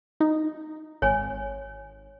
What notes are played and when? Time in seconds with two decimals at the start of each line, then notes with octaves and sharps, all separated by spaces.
0.20 D#4
1.02 G#1 C#5 G#5